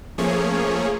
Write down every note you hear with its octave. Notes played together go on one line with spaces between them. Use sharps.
F3 A3 A#3 C#4 G#4 C#5